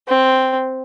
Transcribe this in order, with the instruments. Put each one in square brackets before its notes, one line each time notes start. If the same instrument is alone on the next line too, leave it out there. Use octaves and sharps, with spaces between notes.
[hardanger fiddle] C4